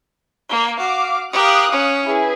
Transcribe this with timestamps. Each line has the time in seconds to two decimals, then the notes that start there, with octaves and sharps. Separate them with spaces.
0.47 A#3
0.77 F#4 F5 D6
1.32 G4 A#4 F5 D#6 F#6
1.71 C#4
2.04 E4 G#4 B4